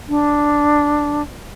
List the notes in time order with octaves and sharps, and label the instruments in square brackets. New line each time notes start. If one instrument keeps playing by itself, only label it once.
[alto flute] D4